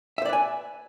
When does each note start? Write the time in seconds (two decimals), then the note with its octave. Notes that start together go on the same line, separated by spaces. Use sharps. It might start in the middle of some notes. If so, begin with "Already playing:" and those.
0.18 E5
0.22 C5
0.26 D5
0.29 B4
0.33 G#5